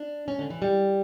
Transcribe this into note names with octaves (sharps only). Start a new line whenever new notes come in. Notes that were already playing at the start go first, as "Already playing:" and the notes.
Already playing: D4
C#4
D3
E3
G3